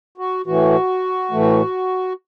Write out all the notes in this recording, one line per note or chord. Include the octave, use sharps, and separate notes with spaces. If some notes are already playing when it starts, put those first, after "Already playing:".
F#4
A2 E3 A3 F#4
A2 E3 A3